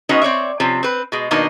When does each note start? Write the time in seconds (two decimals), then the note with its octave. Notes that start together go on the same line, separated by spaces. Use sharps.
0.09 G#3 B3 C#4 D#4 F#4 F#5
0.22 C4 C#5 D5 E5
0.60 C3 F3 C4 C#4
0.83 C4 B4
1.12 B2 G#3
1.31 B2 D#3 A#3 B3 D4 D#4